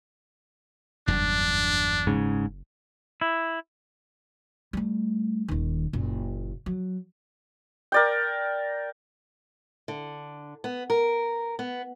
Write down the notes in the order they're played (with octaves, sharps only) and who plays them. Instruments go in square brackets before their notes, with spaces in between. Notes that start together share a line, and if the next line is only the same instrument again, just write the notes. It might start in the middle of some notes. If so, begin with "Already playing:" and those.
[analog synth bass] F#1 [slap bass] E2 G2 F#3 [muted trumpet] D4
[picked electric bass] G#2 C#3
[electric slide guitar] E4
[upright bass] G3 A3
D#1 D#3
F#1 A#2
F#3
[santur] A#4 D5 G5
[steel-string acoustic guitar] D3
B3
A#4
B3